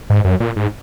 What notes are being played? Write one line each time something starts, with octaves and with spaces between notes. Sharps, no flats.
G#2
F#2
A#2
G#2